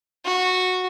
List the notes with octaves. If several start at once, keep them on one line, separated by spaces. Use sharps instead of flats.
F#4